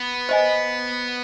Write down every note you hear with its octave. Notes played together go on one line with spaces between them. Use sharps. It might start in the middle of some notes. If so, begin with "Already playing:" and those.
Already playing: B3
C5 D#5 G#5